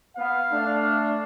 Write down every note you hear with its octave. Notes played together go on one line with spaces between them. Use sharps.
B3 F5
A3 D4